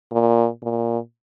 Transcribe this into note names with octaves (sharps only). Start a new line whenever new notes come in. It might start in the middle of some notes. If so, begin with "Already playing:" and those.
A#2
A#2